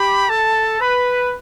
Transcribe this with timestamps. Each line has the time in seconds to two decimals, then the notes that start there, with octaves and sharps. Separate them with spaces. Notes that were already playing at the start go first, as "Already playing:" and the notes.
Already playing: G4 B5
0.28 A4 A5
0.80 B4 B5